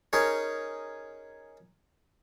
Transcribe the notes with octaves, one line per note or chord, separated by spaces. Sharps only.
C#4 D#4 G#4 A#4 C#5